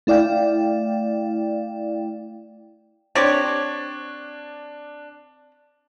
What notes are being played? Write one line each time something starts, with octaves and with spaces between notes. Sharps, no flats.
A3 E4 D5 F5 G5
C4 D4 G4 C#5 A6